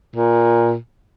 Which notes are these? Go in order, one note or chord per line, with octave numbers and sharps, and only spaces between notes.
A#2